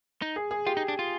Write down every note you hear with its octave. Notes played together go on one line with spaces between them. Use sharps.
D#4
G#4
G#4
F4 G4
D#4
D4
F4